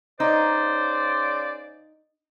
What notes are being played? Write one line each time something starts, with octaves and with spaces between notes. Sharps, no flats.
C#3 D#4 C5 D5